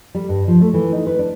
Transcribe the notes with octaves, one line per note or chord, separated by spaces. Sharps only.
G3
G2
F3
A3
E3
D#4
B4
D4